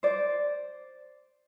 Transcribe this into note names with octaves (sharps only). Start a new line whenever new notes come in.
C5 D5